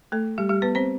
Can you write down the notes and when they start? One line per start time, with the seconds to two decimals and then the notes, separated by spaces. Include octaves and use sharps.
0.12 A3 A4
0.38 G3 G4
0.49 G3 G4
0.62 B3 B4
0.75 C4 C5